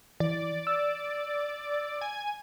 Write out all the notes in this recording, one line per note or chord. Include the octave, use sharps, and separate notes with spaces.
E3 D5
E6
G#5